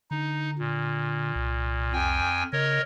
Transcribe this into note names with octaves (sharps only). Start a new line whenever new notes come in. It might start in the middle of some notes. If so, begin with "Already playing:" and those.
D3 D#4
A#2
C2
F2 G5 G#5
C#3 A#4 C#5 D#5